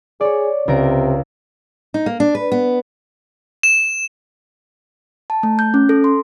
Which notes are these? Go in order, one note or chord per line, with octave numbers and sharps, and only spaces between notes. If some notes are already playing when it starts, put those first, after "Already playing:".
G#4 C#5 D5
C#2 C3 A#4 D7
D#4
A#3
D4
B4
B3
E7
A5
A3
G6
C#4
A4
C6